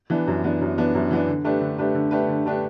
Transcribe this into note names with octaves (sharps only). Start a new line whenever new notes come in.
E3 B3 D4
F#2
E3 B3 D4
F#2
E3 B3 D4
F#2
E3 B3 D4
D3
A3 D4 G4 B4
D3
A3 D4 G4 B4
D3
A3 D4 G4 B4
D3
A3 D4 G4 B4